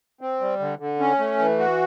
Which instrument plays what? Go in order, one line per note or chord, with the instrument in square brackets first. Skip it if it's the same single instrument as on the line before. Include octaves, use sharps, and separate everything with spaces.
[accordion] C4
G3
D3
D3
C#4
A3
E3
F#4